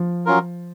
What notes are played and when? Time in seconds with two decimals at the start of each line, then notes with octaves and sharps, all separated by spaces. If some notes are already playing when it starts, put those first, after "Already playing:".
Already playing: F3
0.26 F#3 C#4 F4 A#4